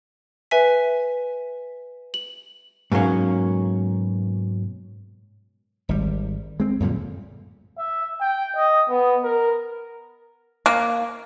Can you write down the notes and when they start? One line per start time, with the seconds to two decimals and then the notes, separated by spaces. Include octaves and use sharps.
0.51 B4 E5 G#5 B6
2.14 F#7
2.92 G#2 B2 F#3 A#3 C#4
5.89 G#1 G3
6.60 G#3 C4
6.80 F#2 A#2 D3 G3
7.78 E5
8.21 G5
8.56 D#5
8.89 B3
9.24 A#4
10.66 A#3